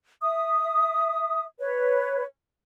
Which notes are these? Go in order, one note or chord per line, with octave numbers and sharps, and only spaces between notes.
E5 D#6
B4 C#5